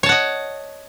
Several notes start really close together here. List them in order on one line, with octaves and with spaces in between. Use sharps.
C#5 A5 F#5 D#5